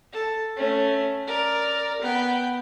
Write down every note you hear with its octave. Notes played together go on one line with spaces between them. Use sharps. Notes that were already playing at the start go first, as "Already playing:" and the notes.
A4
A3 C#4
A#4 D5
B3 G5